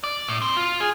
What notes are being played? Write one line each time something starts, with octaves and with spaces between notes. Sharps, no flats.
D5
A2
C4
F4
G#4